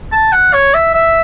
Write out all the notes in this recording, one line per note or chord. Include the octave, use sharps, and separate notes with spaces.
A5
F#5
C#5
E5
E5